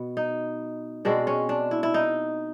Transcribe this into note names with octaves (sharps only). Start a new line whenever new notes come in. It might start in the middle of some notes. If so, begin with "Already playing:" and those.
Already playing: B2 B3
D#4
B2 G#3 C4 D4
C#4
D4
E4
E4
D#4